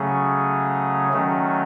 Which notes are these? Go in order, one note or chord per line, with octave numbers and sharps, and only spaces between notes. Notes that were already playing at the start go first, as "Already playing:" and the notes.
Already playing: C#3 F#3 A3 C#4 G#4
D#3 F#3 A3 C#4